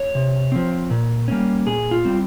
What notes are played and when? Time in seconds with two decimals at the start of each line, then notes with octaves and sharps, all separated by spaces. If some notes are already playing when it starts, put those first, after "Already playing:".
Already playing: C#5
0.15 C3
0.52 F3 C4
0.90 A#2
1.28 G3 A#3 C#4
1.66 A#2 G#4
1.91 F4
2.05 G3 C4